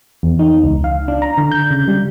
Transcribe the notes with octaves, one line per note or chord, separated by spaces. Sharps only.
E2
D#4
C#2
F5
D4
A#5
D3
G6
C#3
G3